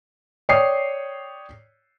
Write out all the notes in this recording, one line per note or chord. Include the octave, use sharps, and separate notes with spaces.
C#5 D5 G5 D#6 C7